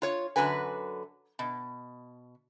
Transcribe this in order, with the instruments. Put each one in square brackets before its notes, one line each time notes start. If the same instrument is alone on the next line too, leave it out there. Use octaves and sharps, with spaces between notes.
[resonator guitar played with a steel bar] F4 C#5
F#2 D3 F#4 B4 G#5
B2